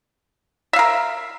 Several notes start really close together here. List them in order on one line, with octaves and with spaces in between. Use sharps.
E5 F5 A#4